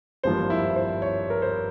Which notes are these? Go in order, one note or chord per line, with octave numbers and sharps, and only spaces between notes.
G#1 G2 F3 A#3 C5
E4
C5
C#5
A#4
C5